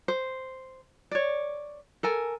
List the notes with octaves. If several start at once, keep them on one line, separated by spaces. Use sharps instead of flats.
C5
C#5 D5
A4 A#4 G#5